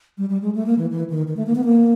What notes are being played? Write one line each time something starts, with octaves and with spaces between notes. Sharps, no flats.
G3
G3
G#3
A3
A#3
E3
E3
D#3
D#3
A3
A#3
B3
A#3